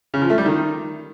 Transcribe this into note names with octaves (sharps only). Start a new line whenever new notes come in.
C#3
F3
A3
G3
D#3